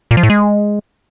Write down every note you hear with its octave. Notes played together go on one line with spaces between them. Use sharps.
A#2
F3
A2
G#3